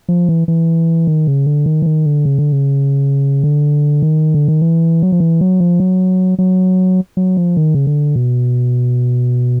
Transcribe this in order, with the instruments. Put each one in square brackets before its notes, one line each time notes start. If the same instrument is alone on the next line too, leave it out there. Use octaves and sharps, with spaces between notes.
[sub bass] F3
E3
E3
D#3
C#3
D3
D#3
E3
D#3
D3
C#3
D3
C#3
D3
D#3
D3
D#3
E3
F#3
F3
E3
F#3
F3
F#3
F#3
F#3
F3
D#3
C#3
D3
B2